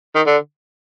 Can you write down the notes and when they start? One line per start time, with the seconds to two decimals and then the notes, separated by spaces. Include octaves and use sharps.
0.15 D#3
0.26 D3